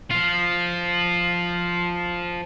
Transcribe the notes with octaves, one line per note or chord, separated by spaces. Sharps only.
F3 F4